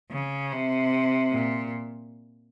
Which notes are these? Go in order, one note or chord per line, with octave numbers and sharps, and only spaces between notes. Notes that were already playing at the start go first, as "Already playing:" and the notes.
C#3
C3
A#2